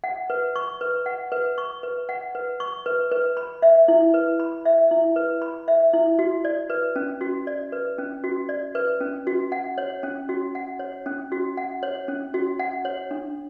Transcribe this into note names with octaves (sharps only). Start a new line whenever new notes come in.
F#5
B4
C#6
B4
F#5
B4
C#6
B4
F#5
B4
C#6
B4
B4
B5
E5
E4
B4
B5
E5
E4
B4
B5
E5
E4
F#4
D5
B4
C#4
F#4
D5
B4
C#4
F#4
D5
B4
C#4
F#4
F#5
C#5
C#4
F#4
F#5
C#5
C#4
F#4
F#5
C#5
C#4
F#4
F#5
C#5
D4